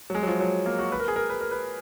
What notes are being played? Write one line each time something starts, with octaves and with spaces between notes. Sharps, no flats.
F#3
G#3
F#3
F3
F#3
A#3
F#4
B4
A#4
G#4
A#4
B4
A#4
B4